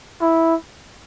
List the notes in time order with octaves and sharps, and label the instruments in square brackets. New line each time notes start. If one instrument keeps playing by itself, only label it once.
[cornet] E4